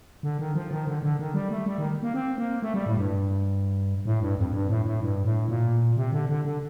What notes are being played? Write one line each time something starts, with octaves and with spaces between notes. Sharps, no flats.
D3
D#3
F3
D#3
D3
D3
D#3
G3
A3
G3
D#3
A#3
C4
A#3
A3
G3
A2
G2
A2
G2
F2
G2
A2
A2
G2
A2
A#2
C3
D3
D3
D3